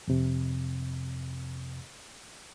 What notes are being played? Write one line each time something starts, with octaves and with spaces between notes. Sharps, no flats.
F2 C3